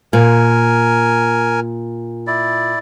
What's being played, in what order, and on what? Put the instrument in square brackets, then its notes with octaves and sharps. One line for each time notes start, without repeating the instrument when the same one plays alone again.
[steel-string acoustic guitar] A#2 [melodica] A#4 G#5
[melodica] E4 D5